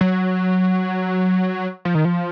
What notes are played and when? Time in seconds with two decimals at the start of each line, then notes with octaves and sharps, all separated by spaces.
0.01 F#3
1.85 F3
1.95 D#3
2.05 F3